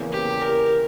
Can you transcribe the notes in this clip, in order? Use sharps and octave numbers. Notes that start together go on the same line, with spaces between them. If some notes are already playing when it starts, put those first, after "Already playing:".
Already playing: E2 C#3 E3 A#3
G4
A#4